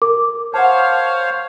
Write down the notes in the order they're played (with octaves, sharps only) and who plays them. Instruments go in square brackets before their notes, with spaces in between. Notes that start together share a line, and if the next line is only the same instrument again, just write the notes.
[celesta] A#4 D6
[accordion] C5 C#5 F5 [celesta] F#5 A5